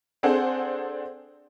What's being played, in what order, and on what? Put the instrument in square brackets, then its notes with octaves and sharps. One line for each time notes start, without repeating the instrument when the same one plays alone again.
[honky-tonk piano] C4 D4 G#4 A4 C5 F#5